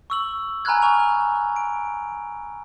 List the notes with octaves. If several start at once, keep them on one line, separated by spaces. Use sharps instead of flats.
C#6 E6 F#7
G#5 A#5 B5 F6 F#6 G#6
G#5 C#6 F7
D7